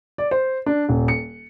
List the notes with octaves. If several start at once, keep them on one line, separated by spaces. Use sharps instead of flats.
D5
C5
D4
D#1
C#7